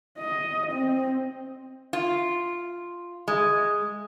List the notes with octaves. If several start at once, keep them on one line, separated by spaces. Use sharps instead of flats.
D#5
C4
F4
G#3